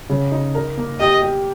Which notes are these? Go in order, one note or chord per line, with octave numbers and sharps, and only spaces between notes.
C#3
D#4
A#4
A#3
G4 D#5
G4